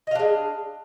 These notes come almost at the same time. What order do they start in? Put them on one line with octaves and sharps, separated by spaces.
D#5 F5 D4 G#4